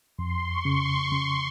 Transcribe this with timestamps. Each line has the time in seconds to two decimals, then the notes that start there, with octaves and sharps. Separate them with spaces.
0.18 F2 C6
0.50 C#6
0.65 C#3
0.81 C6
1.12 C#3 C6